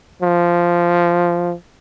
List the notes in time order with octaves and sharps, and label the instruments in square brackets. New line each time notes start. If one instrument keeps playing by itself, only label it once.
[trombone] F3